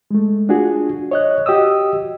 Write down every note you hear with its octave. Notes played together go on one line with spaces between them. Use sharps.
G#3 A3
D4 F4 F#4 G#4
C#5 D#5 F#6
F#4 G4 D#5 D#6 E6